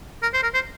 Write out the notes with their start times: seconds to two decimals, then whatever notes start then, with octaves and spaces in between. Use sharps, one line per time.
0.22 A#4
0.34 C5
0.43 A#4
0.54 C5